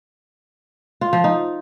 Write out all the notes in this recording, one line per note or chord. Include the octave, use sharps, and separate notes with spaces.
F4
F3
D#4